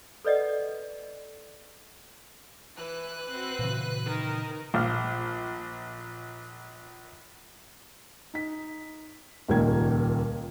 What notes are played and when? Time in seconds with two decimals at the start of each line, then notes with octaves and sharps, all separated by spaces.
0.25 A4 B4 D5 D#5 F#5
2.76 E3 B4 F#6
3.29 C4 F#4
3.59 A#2 C#3 E3
4.04 D#3 A#4
4.74 A#1 F4 F6
8.34 D#4 B6
9.49 D#1 C#2 A#2 D#3 A#3 G#6